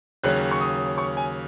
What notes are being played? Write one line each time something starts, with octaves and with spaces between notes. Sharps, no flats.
D#2 C#3 F#3 C#4 F#6
C#6
D#6
C#6
G#5